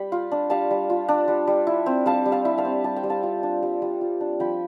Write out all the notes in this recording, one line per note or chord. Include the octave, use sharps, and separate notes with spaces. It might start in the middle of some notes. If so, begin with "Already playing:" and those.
Already playing: G3 G5 B5
F4
D4
G3 F5 A5
G3
F4
D4
G3
G3
E4
C4
G3 F5 A5
G3
F5 A5
E4
F5 A5
C4
G3 A5
G5
G3
F5 A5
F4
D4
G3
G3
F4
D4
F3 G5 B5